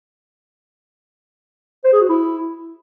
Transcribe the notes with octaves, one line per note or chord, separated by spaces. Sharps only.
C5
G#4
F#4
E4